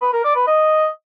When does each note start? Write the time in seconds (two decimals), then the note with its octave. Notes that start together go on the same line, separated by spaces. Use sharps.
0.01 B4
0.13 A#4
0.24 D5
0.35 B4
0.47 D#5